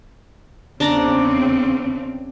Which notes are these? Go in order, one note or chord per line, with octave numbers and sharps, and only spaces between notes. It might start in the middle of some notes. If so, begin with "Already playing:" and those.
E2 C#3 C4 D4 D5 A#5